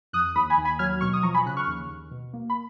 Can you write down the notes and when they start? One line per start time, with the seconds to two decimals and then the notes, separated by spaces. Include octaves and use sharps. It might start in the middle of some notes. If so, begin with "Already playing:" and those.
0.13 F2 D#6 F#6
0.35 D#2 B5 D#6
0.50 G#5 B5
0.57 D#2
0.65 G#5 B5
0.79 F#3 F6 G#6
1.01 B2 C#6 F6
1.13 D#6
1.23 F3 A#5 C#6
1.34 G#5 B5
1.46 C#3 F#6
1.57 C#6 F6
1.67 D#2
1.89 D#2
2.11 B2
2.33 A#3
2.50 B5